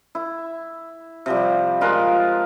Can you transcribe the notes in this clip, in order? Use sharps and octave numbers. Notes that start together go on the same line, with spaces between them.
E4
C3 F3 G3
G#3 F4 A#4 B4